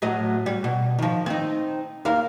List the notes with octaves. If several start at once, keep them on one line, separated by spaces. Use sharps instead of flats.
A2 F#3 D#5
G3
B2
D#3 F3
C4 D#4
D#2 A#4 F5